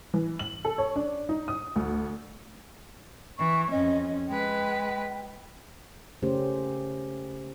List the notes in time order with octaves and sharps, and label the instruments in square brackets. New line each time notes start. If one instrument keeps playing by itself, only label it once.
[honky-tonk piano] E3
F#7
A4
C#5
D4
D#4
D#6
D2
[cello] E3 [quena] C#6
[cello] F2 C#4 [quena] D#5
[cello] G#3 B4 [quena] G5
[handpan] C#3 A3 C#4 G4 A#4 C5